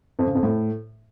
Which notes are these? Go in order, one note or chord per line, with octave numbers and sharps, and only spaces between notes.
F2
C#3
F2
A2